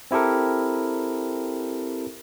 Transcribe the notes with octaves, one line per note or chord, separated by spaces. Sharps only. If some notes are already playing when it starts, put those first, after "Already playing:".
C4 E4 G4 A4 A#4